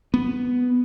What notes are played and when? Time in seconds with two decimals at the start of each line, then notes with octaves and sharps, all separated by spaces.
0.14 B3